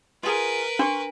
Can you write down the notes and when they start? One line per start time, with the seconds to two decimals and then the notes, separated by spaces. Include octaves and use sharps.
0.23 F4 G#4 A#4 B4
0.79 D4 C6 C#6